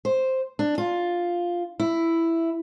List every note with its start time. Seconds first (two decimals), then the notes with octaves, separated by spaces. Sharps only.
0.05 C5
0.59 D4
0.78 F4
1.80 E4